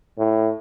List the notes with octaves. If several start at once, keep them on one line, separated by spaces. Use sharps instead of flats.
A2